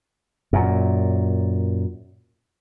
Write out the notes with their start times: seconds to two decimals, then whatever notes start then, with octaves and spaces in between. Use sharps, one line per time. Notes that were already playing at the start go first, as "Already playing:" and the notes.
0.53 F#2 A#2